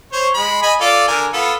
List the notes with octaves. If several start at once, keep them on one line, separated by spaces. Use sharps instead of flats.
C5 C#5
G#3 B5
D#5 G#5 B5
F4 A4 D5
D3 A#4 G#5
B3 F4 A4